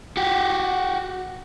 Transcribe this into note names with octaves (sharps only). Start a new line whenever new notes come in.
F#4 G4